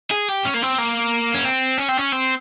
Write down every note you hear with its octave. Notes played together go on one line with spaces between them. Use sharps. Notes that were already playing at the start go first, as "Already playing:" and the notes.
G#4
G4
C#4
A#3
C4
A#3
C#4
C4
C#4
C4
C#4
C4